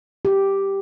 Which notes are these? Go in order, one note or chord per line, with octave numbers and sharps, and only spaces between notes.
G4